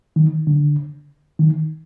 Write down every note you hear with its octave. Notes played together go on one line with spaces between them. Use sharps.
D#3
D3
D#3